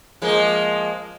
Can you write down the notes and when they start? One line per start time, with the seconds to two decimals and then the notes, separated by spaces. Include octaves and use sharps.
0.22 F3 G#3 A#3